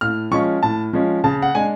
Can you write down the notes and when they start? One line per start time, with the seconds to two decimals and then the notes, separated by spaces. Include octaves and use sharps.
0.01 A2 F6
0.31 F3 G#3 C#4 C#6
0.63 A2 A5
0.93 F3 G#3 C#4
1.24 C#3 A5
1.42 F#5
1.55 G#3 D4 G#5